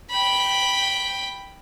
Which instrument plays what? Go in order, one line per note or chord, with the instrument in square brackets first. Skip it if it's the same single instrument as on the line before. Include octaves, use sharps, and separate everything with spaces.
[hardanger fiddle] G5 B5